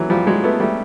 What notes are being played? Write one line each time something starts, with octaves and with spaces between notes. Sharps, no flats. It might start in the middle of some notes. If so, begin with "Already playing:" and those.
Already playing: E3 F#3
F3 G3
F#3 G#3
A3 B3
G3 A3